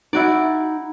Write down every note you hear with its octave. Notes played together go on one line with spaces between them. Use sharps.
D#4 E4 F#4 D5